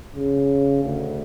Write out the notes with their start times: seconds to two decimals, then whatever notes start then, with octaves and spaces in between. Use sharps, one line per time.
0.16 C#3
0.83 D2